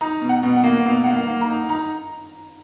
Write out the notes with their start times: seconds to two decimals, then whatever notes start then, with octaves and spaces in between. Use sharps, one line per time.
0.01 D#4 A#5
0.22 B2
0.29 F#5
0.43 B2
0.56 F#5
0.64 A#3
0.86 B2 F5
1.04 A#3 F#5
1.14 F5
1.27 A#3
1.41 A#5
1.49 D#4
1.69 D#4 A#5